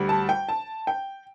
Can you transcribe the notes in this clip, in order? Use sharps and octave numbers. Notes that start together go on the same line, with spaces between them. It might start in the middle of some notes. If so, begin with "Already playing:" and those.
Already playing: D2 G3
A5
G5
A5
G5